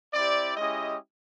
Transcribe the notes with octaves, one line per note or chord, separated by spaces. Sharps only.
C4 E4 G4 D5
G#3 C#4 E4 G4 D#5